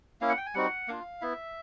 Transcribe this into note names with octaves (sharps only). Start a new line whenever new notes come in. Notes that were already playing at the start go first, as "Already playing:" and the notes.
A#3 C#4 E4 F5
F#5
G5
G#5
G3 C4 D#4 F#4 F#5
A#3 D4 F4 F5
B3 E4 E5